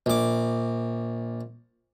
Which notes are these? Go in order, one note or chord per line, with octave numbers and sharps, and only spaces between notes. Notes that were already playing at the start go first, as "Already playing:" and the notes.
A#1 D6